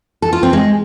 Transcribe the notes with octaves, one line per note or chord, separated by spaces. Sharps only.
A4
F4
C4
G#3